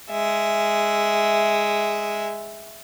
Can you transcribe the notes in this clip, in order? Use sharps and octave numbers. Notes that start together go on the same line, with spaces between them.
G#3 E5